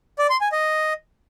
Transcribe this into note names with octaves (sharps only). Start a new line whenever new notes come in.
D5
C6
G#5
D#5